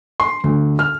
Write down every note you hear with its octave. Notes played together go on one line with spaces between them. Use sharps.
C6
D2
F6